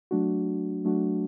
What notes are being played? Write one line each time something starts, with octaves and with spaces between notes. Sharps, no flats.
F#3 A3 D4 F#4
F#3 A3 D4 F#4